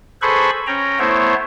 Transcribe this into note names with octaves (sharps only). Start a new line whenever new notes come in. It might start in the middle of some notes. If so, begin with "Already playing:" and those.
G#4 A4 B4 C5 B5 C#6
C#4 G5 A#5
A3 B3 E4 C5 C#5 E5